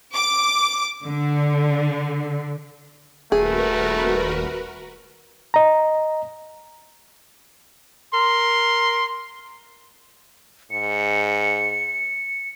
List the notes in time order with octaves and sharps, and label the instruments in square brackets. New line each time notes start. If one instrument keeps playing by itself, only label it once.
[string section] D6
D3
[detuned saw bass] D#1 [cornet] A3 [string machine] F#4 A#4 B4 [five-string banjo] G#4
[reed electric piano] D#5 A#5
[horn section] A#4 C6
[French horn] G#2 [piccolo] C#7